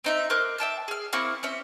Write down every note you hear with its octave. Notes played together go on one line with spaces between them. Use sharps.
C4 D#4 E5
A#4 C5 D6 F#6
E5 G5 A5 F6
G#4 F6
A#3 C4 E4 C#6
C4 C#4 E5